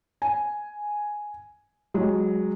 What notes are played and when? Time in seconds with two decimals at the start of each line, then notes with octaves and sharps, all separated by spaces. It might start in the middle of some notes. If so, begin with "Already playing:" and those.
0.22 G#5
1.94 F#3 G#3